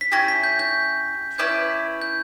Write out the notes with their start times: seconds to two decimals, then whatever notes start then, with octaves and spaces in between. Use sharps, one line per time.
0.01 B6
0.12 C#4 E4 G4 A#6
0.28 B6
0.44 G6
0.59 G6
1.38 C#4 E4 B4 D5 G6
2.02 G6